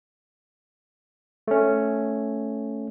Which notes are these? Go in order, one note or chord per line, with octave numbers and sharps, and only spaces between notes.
A3 C#4